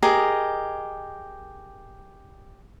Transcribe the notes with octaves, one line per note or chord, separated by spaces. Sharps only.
G4 G#4 A#4 D#5